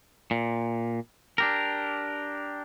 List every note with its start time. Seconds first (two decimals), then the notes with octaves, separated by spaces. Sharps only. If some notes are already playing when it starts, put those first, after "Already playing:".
0.31 A#2
1.38 D4 G4 A#4